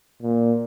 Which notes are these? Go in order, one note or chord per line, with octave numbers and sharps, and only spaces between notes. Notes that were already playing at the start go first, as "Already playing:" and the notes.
A#2